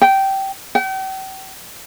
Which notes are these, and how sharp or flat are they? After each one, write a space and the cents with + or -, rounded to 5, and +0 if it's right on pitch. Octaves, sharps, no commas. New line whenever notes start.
G5 -15
G5 -40